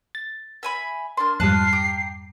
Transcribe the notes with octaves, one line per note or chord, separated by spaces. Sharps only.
A6
E5 G#5 B5
A#3 D4 C6
F2 G#2 G3 F4 A5 F#6 C7
G4 A#5